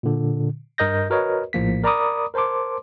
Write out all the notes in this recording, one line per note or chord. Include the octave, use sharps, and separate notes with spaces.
A#2 D3
G2 A#4 D#5 G6 A#6
F#4 A#4 B4 C#5 D#5
A#1 A2 F3 A#3 B6
A#4 D5 A#5 B5 D6 D#6
A#4 C5 A5 C6 D6